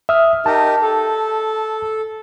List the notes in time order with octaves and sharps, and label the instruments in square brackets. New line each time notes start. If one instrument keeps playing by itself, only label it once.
[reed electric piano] E5 D#6 F6
[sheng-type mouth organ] D#4 G4 A#4 [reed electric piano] A5
[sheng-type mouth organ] A4